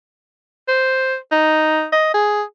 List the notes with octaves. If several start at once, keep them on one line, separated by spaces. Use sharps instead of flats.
C5
D#4
D#5
G#4